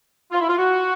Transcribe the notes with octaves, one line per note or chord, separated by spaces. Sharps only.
F4
E4
F4
F#4